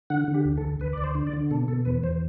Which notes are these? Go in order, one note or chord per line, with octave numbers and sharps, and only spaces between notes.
D3 F#5
D3
G4
D2
A4
D2
D2 B4
D2 D5
C5
D3
D5
D3
B2 A4
B2 A4
E2 B4
E2 C5